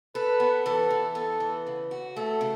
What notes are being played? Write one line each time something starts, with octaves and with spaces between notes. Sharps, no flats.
A4 B4
B3
E3 A4
E3
B3 A4
E3
C#3
F#4
A3 A4
C#3